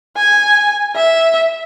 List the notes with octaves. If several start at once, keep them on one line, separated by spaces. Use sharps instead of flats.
G#5
E5